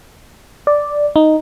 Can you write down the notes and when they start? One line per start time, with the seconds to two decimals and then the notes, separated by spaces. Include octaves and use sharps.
0.67 D5
1.16 D#4